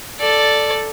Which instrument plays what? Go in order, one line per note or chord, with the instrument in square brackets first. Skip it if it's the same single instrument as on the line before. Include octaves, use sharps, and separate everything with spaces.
[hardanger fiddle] A4 D5